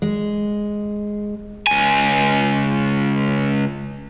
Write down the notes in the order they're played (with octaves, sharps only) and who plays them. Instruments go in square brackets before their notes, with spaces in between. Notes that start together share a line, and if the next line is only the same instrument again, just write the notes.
[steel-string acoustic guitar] G#3
[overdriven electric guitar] C#2 G#5